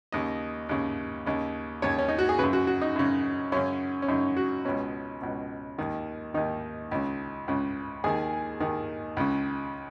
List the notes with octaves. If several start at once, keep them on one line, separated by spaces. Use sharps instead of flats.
D#2 C#3 D#5
D#2 C#3
D#2 C#3
D#2 C#3 C#5
C#4
D#4
F#4
G#4
F#2 C#3 B4
F#4
F#4
D#4
F#2 C#3
F#2 C#3 C#4
C#4
F#2 C#3 D#4
F#4
C#2 B2 C#4
C#2 B2
D#2 D#3
D#2 D#3 D#4
C#2 C#3
C#2 C#3
D#2 D#3 G#4
D#2 D#3
C#2 C#3